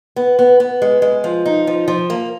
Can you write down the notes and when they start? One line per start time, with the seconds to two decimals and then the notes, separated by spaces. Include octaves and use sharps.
0.16 B3
0.39 B3
0.60 B3
0.82 G#3
1.02 G#3
1.24 F3
1.46 D#4
1.67 F3
1.88 F3
2.10 A#3